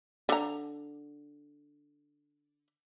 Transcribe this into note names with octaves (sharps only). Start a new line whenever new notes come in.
D3 A#5